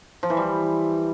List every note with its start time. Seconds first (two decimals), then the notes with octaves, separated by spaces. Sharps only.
0.23 F3
0.30 E3
0.37 G3